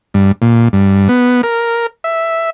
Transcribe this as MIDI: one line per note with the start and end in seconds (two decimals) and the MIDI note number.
0.14 0.32 43
0.42 0.68 46
0.73 1.08 43
1.09 1.41 59
1.43 1.87 70
2.04 2.50 76